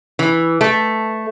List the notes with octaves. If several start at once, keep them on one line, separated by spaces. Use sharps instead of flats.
E3
A3